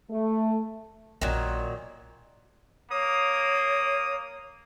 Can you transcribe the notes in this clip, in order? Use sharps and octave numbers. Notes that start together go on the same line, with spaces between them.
A3
A#1 A#2 D#3 F#3 C#4
A#3 C#5 D#6